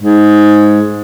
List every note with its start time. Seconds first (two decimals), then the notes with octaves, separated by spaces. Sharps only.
0.02 G#2